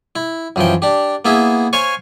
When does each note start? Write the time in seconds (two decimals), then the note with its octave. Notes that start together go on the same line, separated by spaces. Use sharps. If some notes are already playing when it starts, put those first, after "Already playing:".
0.16 E4
0.56 F#2 E3 F3 G5
0.82 D4 G4
1.25 A#3 B3 E4 G#4 E5
1.73 C5 C#5 F5 G#5 C#6